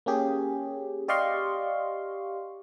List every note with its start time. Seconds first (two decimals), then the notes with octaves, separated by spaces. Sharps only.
0.06 A#3 C#4 G4 G#4
1.08 G4 D5 D#5 F5 C6 C#6